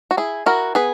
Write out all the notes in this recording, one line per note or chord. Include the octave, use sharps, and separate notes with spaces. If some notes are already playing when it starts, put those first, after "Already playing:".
F#4
E4 G#4
E4 F#4 A#4
B3 G#4 B4